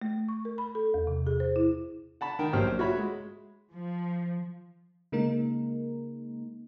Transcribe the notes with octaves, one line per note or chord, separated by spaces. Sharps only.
A3
C#6
A#4
B5
A4
E2
C3
G#4
C5
E4
F#5 A5 B5
D#3 A#4 G5 A5
A#1 F#3 G4 C5 F6
F#4 C#5 E5 B5
G#3
F3
C#3 G#3 A#3 D#4 A#4